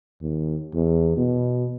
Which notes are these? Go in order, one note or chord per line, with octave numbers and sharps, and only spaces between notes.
D#2
E2
B2